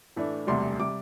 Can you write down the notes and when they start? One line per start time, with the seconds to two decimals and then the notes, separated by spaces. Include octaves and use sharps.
0.16 A2 E3 A3 D4
0.47 E1 D2 C3 G3 C6
0.79 C3 G3 D6